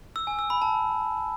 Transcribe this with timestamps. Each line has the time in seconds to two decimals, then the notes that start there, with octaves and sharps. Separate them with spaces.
0.16 E6
0.27 G#5
0.39 E6
0.50 B5
0.62 A5